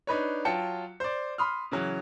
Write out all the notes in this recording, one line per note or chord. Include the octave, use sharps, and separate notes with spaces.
D4 D#4 B4 C#5
F#3 F4 G5 A5 C#7
C5 D5
B5 C6 D#6 F6
C#3 E3 F#3